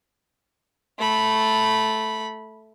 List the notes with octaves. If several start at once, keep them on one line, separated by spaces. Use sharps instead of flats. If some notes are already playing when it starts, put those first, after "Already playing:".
A3 B5